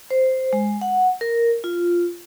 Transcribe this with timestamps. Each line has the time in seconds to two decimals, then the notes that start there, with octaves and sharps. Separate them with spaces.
0.11 C5
0.53 G#3
0.81 F#5
1.21 A#4
1.64 F4